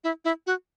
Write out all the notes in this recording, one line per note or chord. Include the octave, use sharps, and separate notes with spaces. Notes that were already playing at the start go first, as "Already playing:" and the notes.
E4
E4
F#4